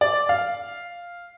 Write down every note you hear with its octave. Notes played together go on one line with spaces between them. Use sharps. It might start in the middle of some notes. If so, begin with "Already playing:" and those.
D5
F5